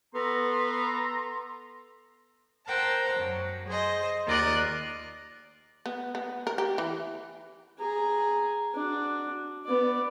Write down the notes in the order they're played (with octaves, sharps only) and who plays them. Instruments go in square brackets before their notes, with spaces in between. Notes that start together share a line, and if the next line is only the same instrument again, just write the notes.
[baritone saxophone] B3 [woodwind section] A4 A#5 C6
[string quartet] A#4 C5 F#5 G5 A5
F#2 F#3
G#4 C5 D#5
D#2 F4 A#4 D5 D#5 F#6
[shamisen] B3
B3
A#4
G4
E3
[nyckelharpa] G#4 A#5
D4 F#4
B3 D5